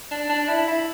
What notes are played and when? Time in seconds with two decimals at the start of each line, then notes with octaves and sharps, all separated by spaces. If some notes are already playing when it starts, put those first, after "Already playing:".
0.11 D4
0.29 D4
0.48 E4
0.68 E4